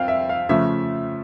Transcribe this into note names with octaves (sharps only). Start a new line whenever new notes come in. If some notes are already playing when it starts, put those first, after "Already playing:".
Already playing: F2 F5 G5
E5
F5
C#3 F3 A3 E5